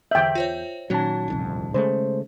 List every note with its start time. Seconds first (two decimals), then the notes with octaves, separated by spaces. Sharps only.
0.11 E2 D3 E5 G5 G6 F#7
0.35 F4 C5 C#5
0.90 A#2 D#3 F#3 C#4 D#4 A5
1.28 D1 C2 F2
1.74 C#3 G#3 A3 C5